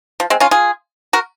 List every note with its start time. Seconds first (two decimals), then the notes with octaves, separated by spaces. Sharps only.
0.20 F3
0.30 G#3 C4
0.40 C#4 F4
0.51 F4 G#4
1.13 F#4 A#4